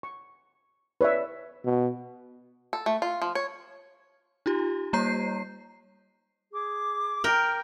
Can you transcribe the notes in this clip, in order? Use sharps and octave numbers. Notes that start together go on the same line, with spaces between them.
C#6
B4 C#5 D5 E5
B2
A4
A3
F4
F3
C#5
D#4 F4 G4
G3 A#3 C#5 A#5 G6 C7
G#4 D6
A#4 G5 F6